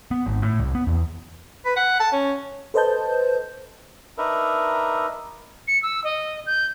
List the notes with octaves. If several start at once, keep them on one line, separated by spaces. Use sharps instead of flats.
B3
G#1
A2
C2
B3
E2
B4
F#5
A5
C#4
A4 B4 C5 D#5 A5 G6
D4 D#4 A#4 B4 E5
C#7
E6
D#5
G6